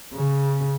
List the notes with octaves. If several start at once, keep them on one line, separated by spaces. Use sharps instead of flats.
C#3